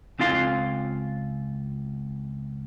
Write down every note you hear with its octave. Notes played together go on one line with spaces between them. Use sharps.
C#2 C4 F4 F5 C6